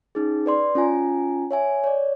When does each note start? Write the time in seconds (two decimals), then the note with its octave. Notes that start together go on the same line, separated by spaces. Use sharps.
0.15 C#4 D#4 G#4
0.46 B4 D5 C6
0.75 C#4 F4 G#5 A#5
1.51 C#5 E5 G#5
1.84 C#5 D5